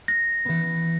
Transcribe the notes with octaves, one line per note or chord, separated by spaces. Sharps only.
A#6
E3 B3